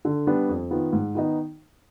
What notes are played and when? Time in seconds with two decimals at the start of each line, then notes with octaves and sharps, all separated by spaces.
0.05 D3
0.27 G3 B3 D4
0.49 F2
0.71 D#3 B3 F4
0.93 G#2
1.15 D#3 B3 D#4